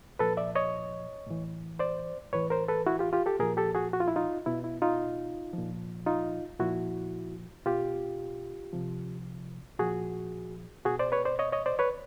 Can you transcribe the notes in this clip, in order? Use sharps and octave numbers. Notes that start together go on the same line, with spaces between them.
A#2 F3 A4 B4
D5 E5
C#5 D#5
A2 E3
C5 D5
A2 E3 B4 C#5
A#4 C5
A4 B4
E4 F#4
F4 G4
F4 G4
G4 A4
A#2 F3 G#4 A#4
G4 A4
F#4 G#4
F#4
F4
E4
D#4 F4
B2 E4
E4
D#4 F4
A#2 F3
D#4 F4
A#2 F3 E4 F#4
B2 F4 G4
C3 F3
A#2 F3 F#4 G#4
B2 F#4 G#4
C5 D5
B4 C#5
C5 D5
C#5 D#5
C#5 D#5
C5 D5
B4 C#5